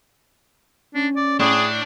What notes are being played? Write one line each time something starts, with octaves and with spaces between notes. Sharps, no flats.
C#4 D4
D5
A2 D4 G#4